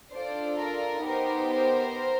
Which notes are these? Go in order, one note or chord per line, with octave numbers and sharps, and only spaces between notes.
D4 F4 A4 C5 D5
A#4
B3 D#4 G4 A#4 C5
A#4 C5